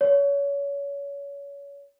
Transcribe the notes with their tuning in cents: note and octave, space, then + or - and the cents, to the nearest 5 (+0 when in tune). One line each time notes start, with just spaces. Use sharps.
C#5 +30